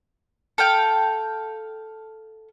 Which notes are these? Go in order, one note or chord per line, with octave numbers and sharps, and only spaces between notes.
A4 F5 G5